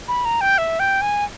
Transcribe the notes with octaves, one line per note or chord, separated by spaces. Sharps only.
B5
A#5
G5
E5
G5
G#5